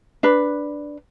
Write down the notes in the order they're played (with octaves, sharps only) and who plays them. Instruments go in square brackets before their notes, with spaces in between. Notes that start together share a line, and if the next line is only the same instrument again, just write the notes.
[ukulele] D4 B4